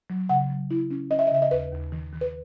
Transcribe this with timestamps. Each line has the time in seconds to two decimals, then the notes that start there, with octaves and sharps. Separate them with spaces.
0.10 F#3
0.29 C#3 F#5
0.50 F#3
0.71 E4
0.91 C#4
1.11 C#4 D#5
1.19 E5
1.27 D#5
1.31 C#3 E5
1.42 D#5
1.51 D#2 B4
1.72 D#2
1.92 D#3
2.13 D#3
2.21 B4